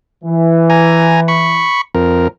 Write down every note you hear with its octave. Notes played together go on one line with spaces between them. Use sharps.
E3
G#5 A#5
B5 C#6
F2 A#4